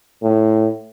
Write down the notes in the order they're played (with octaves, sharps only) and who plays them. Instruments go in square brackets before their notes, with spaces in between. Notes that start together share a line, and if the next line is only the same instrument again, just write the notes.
[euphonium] A2